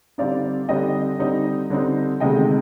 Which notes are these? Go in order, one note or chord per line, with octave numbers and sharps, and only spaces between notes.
D3 G3 C4 D#4 D5 F5
D3 G3 C4 D#4 D#5 G5
D3 G3 C4 D#4
D3 G3 C4 D#4
D2 C3 D#3 G#3 D#5 G5